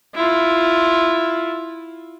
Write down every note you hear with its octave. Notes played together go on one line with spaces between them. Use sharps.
E4 F4